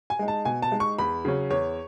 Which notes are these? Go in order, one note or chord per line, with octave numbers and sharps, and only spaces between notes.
G#5
G#3 D#4
A5
B2 G#5
A5
G#3 D#4
C#6
E2 B5
C#3 F#3 C#4
E2 C#5